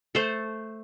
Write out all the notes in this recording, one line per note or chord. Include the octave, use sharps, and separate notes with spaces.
A3 A4 C5